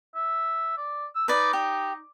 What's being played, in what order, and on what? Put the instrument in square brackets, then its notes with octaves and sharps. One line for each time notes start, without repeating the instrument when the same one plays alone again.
[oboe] E5
D5
E6
[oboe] D#4 [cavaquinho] B4 D5
[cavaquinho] G4